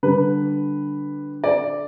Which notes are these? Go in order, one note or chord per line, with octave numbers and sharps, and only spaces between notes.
D3 G3 B4
D5